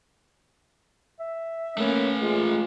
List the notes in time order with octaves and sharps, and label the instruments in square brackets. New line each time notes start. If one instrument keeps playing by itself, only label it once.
[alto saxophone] E5
[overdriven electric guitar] A3 B4 [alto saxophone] A#3 [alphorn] C#4
[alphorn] G#3 [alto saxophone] F4